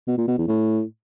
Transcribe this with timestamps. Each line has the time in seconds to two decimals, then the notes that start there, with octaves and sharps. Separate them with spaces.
0.08 B2
0.18 A#2
0.28 B2
0.38 E2
0.48 A2